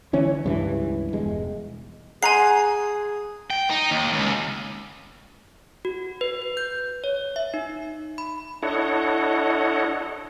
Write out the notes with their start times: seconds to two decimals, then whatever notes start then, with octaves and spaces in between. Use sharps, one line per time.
0.13 D3 E3 C#4
0.44 C#2 G2 E3
1.13 E1 G#3
2.23 G#4 F#5 G#5 A#5 C6 C7
3.50 G5
3.70 D#4
3.91 D#2
4.13 C#2
5.85 F#4
6.21 B4
6.42 B4
6.57 G6
7.04 C#5
7.36 E5
7.54 D#4
8.18 B5
8.63 D4 E4 A4 C#5 D#5 F#5